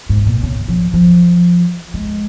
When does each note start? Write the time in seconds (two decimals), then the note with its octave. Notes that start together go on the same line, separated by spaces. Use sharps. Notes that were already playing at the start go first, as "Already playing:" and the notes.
0.09 G#2
0.26 A#2
0.43 C#3
0.68 F3
0.94 F3
1.94 G#3